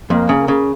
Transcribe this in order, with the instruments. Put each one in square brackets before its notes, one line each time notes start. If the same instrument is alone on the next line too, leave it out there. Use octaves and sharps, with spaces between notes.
[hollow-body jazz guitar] F2 [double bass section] A#3
[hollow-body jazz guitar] C#3
C#3